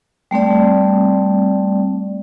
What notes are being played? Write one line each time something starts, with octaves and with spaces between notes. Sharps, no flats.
G3 A3 C4 D5